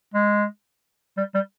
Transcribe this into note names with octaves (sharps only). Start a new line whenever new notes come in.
G#3
G3
G3